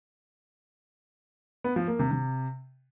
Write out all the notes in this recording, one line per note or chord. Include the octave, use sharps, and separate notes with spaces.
B3
F3
A#3
C3
C3